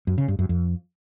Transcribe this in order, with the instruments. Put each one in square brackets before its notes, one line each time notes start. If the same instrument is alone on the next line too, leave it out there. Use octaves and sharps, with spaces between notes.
[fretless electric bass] F#2
C#3
G2
F#2
F2